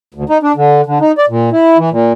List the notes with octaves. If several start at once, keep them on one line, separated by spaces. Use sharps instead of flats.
D2
D#4
D4
D3
D3
D#4
D5
A#2
E4
E3
A#2